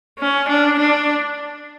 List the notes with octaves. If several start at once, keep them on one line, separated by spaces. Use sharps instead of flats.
C#4
D4
D4